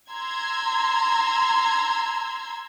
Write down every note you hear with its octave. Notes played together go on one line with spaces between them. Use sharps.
A#5 C6 E6 G#6